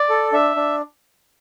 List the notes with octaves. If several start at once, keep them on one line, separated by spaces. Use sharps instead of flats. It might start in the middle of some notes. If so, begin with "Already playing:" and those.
Already playing: D5
A4
D4 E5
D4